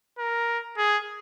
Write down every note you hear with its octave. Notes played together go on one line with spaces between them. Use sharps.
A#4
G#4